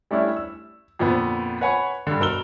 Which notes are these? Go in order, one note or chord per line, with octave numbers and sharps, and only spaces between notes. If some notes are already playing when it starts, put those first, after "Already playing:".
G3 A3 C#4 D4 E4
E6
F2 A#2 D3 B3
B4 C#5 F#5 G#5 B5 C#6
G2 D3
B2 A#4 E6 G7